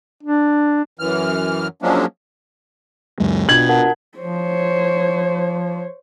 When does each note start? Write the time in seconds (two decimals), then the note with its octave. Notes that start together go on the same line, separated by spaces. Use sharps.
0.23 D4
0.99 F#2 E3 F6
1.82 F3 F#3 G#3 A#3 C#4 D4
3.20 C#2 F#2 G#3
3.49 B2 D4 F4 G#6 F#7
3.69 A#4 F#5 A5
4.18 F3 C5 C#5